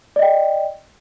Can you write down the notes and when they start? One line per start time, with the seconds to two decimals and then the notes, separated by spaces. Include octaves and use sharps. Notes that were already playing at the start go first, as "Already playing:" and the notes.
0.16 D5
0.19 D#5
0.22 G5